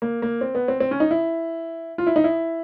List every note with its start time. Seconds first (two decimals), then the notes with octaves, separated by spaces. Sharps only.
0.02 A#3
0.22 A#3
0.41 C4
0.55 B3
0.68 C4
0.80 C4
0.91 C#4
1.00 D#4
1.11 E4
1.98 F4
2.07 E4
2.16 D#4
2.24 E4